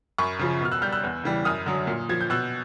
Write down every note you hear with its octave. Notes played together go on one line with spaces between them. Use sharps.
F#2 B5 C#6
C#3 F3
B2 F6
E6 F#6
G3 F6 G6
E6 F#6
E2
C#3 E3 G3
F#2 D#6 F6
D3 F#3
A#2
F3 G#6
G6
B2 E6 F#6